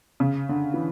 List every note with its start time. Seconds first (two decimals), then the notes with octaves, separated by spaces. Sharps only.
0.20 C#3
0.49 D3
0.74 E3